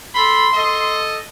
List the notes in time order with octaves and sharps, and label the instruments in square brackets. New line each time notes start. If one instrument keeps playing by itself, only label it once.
[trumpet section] A4 B5 [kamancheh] C6
[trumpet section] A4 D#5